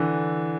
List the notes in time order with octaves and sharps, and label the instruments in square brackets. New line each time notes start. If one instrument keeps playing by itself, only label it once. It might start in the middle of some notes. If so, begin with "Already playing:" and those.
Already playing: [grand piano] D3 E3